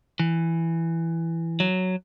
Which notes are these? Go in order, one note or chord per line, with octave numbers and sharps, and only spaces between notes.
E3
F#3